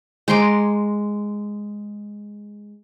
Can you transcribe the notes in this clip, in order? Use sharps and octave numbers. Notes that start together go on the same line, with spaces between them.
G#3 A#5 C6 D6